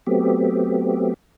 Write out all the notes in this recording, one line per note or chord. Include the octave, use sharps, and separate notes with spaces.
F#3 A3 B3 C4 G4